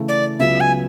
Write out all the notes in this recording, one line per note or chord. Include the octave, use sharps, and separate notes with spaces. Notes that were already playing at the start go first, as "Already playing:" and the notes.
Already playing: C#3 E3 A3
D5
C#2 C#3 F#3 B3 E5
G#5